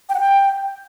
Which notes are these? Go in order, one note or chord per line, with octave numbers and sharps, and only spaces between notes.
G5
F#5
G5